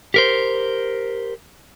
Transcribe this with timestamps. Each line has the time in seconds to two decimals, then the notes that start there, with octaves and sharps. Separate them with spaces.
0.14 G4 A#4 C5